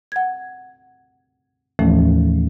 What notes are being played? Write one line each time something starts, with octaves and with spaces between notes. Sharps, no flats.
F#5 G#6
D#2 A2 E3 F3 A3 C#4